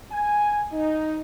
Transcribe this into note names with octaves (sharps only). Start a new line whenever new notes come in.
G#5
D#4